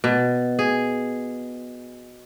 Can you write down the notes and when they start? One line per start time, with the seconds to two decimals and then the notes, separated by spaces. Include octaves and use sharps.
0.04 B2
0.59 G#4